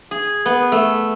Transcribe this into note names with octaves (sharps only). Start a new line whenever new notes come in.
G#4
B3
A3